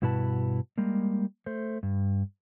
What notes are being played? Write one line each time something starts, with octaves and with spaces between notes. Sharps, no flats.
G2 B2 E4 F#4 B4 A5
G3 G#3 A#3
A3 C5
G2